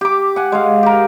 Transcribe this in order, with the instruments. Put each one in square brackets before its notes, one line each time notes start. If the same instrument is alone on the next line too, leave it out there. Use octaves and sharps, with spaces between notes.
[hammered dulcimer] G4 D6
F#5 G#5
G#3 F5
G4 A#4